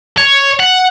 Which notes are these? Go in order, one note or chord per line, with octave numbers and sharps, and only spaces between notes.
C#5
F#5